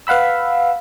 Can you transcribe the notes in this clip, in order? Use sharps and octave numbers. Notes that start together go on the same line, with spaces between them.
B4 F5 F#5 B5 E6